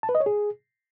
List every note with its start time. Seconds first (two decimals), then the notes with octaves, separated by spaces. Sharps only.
0.03 A5
0.09 B4
0.15 D#5
0.20 C#5
0.26 G#4